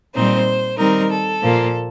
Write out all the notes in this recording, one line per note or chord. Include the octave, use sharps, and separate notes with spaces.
A#2 G3 C4 D#4 C5
D#3 G3 C4 D#4 A#4
A4
A#2 F3 A#3